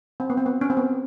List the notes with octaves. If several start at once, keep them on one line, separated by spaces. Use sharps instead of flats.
C4
B3
C4
B3
C#4
C4
B3